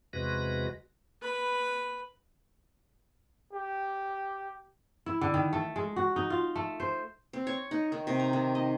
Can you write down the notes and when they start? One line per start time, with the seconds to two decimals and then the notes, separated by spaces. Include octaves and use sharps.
0.13 E2 C3 G#3 F#4 B4 A#6
1.21 B4 B5
3.53 G4
5.06 E4
5.21 D3
5.34 D#3
5.53 A3
5.76 G#3
5.96 F#4
6.16 D#4
6.30 F4
6.56 A3
6.80 C5
7.33 C4
7.47 C#5
7.71 D#4
7.92 D#3
8.07 C3
8.20 A#5
8.33 D#3
8.55 D#5